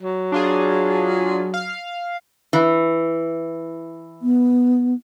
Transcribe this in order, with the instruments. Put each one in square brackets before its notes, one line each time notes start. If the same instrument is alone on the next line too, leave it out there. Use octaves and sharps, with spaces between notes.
[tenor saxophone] F#3
[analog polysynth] D4 F4 G#4
F5
[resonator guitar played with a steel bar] E3
[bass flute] B3